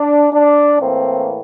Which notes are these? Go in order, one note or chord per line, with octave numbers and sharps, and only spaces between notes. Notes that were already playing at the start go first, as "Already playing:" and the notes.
Already playing: D4
D4
A2 E3 A#3 C4